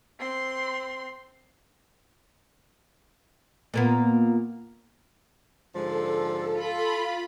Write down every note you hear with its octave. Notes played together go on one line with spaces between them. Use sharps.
C4 C6
A#2 A#3 B3
G#2 D3 F3 A4
F4 B5